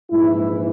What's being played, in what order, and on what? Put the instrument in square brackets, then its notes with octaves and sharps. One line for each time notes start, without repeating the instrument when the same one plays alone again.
[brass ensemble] A#1 G#2 E3 E4